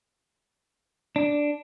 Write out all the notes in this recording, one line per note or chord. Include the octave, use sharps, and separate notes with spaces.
D4